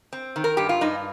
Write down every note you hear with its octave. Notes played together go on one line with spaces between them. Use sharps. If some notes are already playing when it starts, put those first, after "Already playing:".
C4
D#3
A#4
G2 G4
F4
G2 D#4